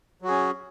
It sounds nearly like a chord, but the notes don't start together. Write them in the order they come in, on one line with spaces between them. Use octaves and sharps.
F#3 F#4 G#4 C#4